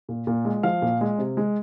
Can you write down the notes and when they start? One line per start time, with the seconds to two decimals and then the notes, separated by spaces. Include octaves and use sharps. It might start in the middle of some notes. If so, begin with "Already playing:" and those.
0.09 A#2
0.27 A#2
0.45 G#3
0.63 F3 F5
0.82 A#2
1.01 G#3
1.18 C3
1.37 G#3